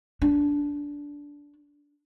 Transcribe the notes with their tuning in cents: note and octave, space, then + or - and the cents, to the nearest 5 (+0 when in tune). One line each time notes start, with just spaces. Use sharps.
D4 -15